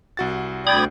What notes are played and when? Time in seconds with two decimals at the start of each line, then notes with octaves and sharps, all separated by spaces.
0.17 C2 F#4 A6
0.67 D2 D5 G5 B5 D#6 G#6